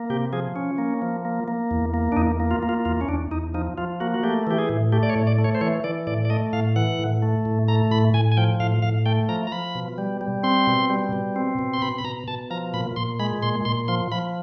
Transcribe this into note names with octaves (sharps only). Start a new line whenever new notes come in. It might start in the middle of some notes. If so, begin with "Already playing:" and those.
Already playing: A#3
C3 G4
F3 G#4
C#4
A#3
F3
A#3
A#3
E2
A#3
D4
E2 D#4
A#3
F4
A#3
F4
E2 F4
C#4
E2 D4
E2 D#4
F3 D#4
F3 F4
A#3 F#4
F#4
A3 G4
E3 G4
G#4
A2
A3 G4
D5
C#5
A2
D5
A3
C#5
C5
E3 C#5
E3 D5
A2 D5
D5
A3 D#5
A2 F5
E3 F#5
A2
A3
A2
A3 A#5
A2 B5
A2 G#5
G#5
F3 G5
A2 F5
A2 F5
A3 G5
F3 A#5
A#5
F3 B5
B2
G3
G3
C4 C6
B2
G3
B2
C4
B2
C6
B2 B5
B5
B2 A#5
B2 A5
F3 A#5
A#2 B5
A#2 C6
G#3 B5
A#2 C6
A#2 C6
F3 C6
F3 B5